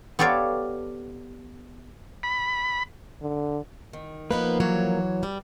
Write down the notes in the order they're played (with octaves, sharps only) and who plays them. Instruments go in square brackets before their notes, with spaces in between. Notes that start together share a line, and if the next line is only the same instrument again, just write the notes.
[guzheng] B3 G4 A4 C#5 D5 F5
[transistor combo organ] B5
[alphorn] D3
[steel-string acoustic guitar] D#3
[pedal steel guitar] F3 A#3 [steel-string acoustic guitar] B3 D#4 B4
[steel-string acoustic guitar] E3 F#3 C#5
G3